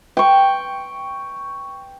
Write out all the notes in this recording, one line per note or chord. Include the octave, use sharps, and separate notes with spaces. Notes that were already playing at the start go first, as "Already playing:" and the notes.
G5 C#6